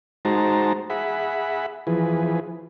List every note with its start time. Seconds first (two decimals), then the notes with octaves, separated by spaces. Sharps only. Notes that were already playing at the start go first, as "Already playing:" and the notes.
0.25 G#3 D#4 F#4 C5 A5 A#5
0.90 G#4 E5 F#5 B5
1.87 E3 F3 G#4 B4